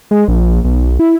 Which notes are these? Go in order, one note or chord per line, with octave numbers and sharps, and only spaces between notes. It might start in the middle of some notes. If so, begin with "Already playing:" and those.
G#3
A#1
B1
E4